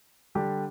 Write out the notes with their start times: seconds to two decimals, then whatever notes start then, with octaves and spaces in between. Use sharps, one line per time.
0.35 D3 G3 D4 G4